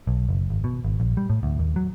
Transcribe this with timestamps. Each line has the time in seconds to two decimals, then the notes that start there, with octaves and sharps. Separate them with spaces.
0.07 B1
0.29 F#1
0.50 G#1
0.64 B2
0.85 G#1
1.00 A#1
1.17 G3
1.30 A2
1.43 D2
1.59 D#2
1.76 F#3